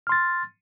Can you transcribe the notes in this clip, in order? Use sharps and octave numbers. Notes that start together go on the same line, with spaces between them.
C6 F6 A6